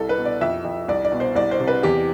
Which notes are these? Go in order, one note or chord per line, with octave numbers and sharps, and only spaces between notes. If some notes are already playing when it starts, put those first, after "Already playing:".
Already playing: C2 A4
B4
B2
D5
F2 E5
F2
C2 D5
D5
B2
C5
C2 D5
C5
C3
B4
E2 G4